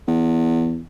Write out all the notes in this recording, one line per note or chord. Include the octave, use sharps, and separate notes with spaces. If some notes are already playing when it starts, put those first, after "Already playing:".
E2